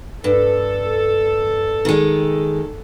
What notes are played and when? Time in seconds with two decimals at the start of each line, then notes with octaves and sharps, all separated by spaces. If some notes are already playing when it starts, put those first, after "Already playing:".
0.24 G2 A4
1.85 D#3 G#3